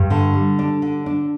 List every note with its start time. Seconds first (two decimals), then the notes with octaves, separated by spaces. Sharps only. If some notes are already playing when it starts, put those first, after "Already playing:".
Already playing: G2
0.10 D3
0.34 G3
0.59 D4
0.82 D3
1.06 D4